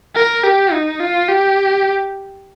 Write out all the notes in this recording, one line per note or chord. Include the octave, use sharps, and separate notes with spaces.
A#4
G4
D#4
F4
G4